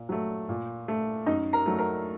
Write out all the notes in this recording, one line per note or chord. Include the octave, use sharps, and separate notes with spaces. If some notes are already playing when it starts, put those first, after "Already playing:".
Already playing: A#2
F#3 A3
A#2
A3
F#2 D#4 D#5
A#4 A#5
F#3 A3
A#4 A#5